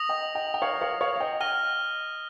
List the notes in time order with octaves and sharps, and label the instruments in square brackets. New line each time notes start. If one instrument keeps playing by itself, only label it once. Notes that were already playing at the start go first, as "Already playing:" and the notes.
Already playing: [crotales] D#6 A#6 F7
[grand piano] D#5 G5
D#5 G5
G5
C#5 F5
C#5 F5
C#5 F5
F5
D#5 G5
[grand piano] D#5 G5 [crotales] F6 A#6 D#7 G7